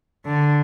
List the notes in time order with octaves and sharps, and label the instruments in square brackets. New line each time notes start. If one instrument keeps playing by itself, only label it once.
[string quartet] D3